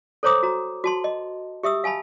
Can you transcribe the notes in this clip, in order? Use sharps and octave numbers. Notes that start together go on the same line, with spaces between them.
A4 C5 C#5 A#5 D6 D#6
F#4 A#5
F#4 A5 C6
D#5
G4 E5 D#6 E6
F5 G#5 A5 B5